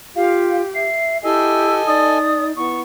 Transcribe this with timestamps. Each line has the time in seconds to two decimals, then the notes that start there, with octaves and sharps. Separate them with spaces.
0.16 F4 G4 F5
0.75 E5 C7
1.24 E4 G4 A4 D#5 G#5 E6
1.87 D#4 D5 D#6
2.57 B3 E4 C#6